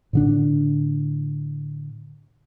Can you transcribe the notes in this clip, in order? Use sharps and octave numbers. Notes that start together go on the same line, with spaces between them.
A2 D3 D4